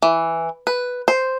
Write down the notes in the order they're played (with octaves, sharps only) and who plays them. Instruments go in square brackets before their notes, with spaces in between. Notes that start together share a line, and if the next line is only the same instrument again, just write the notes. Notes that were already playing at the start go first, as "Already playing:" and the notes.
[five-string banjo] E3
B4
C5